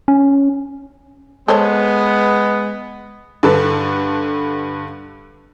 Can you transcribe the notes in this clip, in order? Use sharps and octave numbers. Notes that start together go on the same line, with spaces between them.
C#4
G#3 B3 A4 C5 C#5
G2 D3 A4 B4 A5